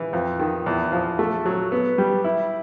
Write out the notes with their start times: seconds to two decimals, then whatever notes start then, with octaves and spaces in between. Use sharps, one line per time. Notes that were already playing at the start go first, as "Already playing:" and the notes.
Already playing: E3
0.13 F2
0.39 D#3
0.66 E2
0.92 F3
1.19 A3
1.46 F#3
1.72 B3
1.98 G3
2.24 E4